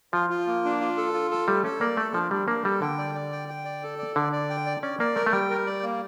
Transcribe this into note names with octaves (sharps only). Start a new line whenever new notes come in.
F3 F4
F4
A#3
D4
F4
A4
F4
A4
G3 A3
C#4 A4
A#3 D5
A3 A4
F3 D4
G3 D4
A#3 D4
G3 A4
D3 G5
D5
D5
G5
G5
D5
A4
D5
D3 D5
D5
G5
D5
C#4 D5
A#3 D5
A3 A#4
A3
G3 G5
A#4
D5
A#3